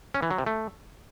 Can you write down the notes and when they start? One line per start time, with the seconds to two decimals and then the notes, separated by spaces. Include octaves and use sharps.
0.14 C#4
0.22 E3
0.30 F#3
0.38 C3
0.46 A3